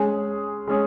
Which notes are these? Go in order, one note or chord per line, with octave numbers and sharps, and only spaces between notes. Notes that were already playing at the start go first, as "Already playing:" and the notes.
Already playing: G#3 C#4 G#4
G#3 C#4 G#4